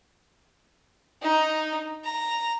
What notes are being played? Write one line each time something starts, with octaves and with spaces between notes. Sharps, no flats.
D#4
A#5